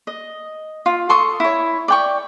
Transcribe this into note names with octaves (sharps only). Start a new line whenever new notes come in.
D#5
F4
A4 C6 C#6 D#6
E4 C#5
D5 G5 C#6